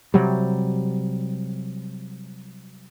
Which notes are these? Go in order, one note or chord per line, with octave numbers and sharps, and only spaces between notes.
C3 F#3 G3